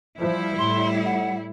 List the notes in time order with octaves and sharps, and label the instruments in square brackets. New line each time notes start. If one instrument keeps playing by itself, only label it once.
[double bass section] F3 [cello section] G3 E4
[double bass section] A2 [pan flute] C6
[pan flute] F#5